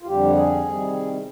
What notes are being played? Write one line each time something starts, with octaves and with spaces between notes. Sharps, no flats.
F4
F2 D3 G3 G4
G#4
C3 D#3 G3